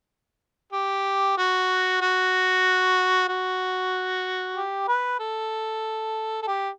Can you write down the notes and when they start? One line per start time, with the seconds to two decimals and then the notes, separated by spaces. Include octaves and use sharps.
0.72 G4
1.37 F#4
2.01 F#4
3.28 F#4
4.56 G4
4.88 B4
5.20 A4
6.42 A4
6.48 G4